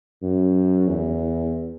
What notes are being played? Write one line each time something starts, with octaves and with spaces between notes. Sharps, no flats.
F#2
E2